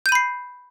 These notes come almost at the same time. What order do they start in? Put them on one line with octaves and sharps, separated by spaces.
G6 D#7 B5 C7